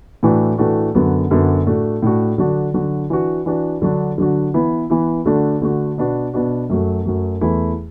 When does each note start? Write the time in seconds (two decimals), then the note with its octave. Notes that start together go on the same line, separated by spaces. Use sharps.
0.23 A2 E3 A3 D4 F#4
0.58 A2 E3 A3 D4 F#4
0.95 F#2 D3 F#3 B3
1.31 F#2 D3 F#3 B3
1.67 A2 A3 D4 F#4
2.02 A2 A3 D4 F#4
2.38 D3 F#3 D4 F#4
2.74 D3 F#3 D4 F#4
3.10 E3 D4 F#4
3.46 E3 D4 F#4
3.82 D3 F#3 D4 F#4
4.18 D3 F#3 D4 F#4
4.54 E3 B3 E4
4.90 E3 B3 E4
5.26 D3 A3 D4 F#4
5.62 D3 A3 D4 F#4
5.98 B2 B3 D4 F#4
6.33 B2 B3 D4 F#4
6.70 F#2 F#3 A3
7.05 F#2 F#3 A3
7.41 E2 E3 A3 E4